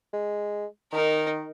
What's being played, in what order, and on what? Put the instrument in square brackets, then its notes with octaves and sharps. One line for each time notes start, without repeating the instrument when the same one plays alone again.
[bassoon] G#3
[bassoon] D#3 [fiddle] D#4 A#4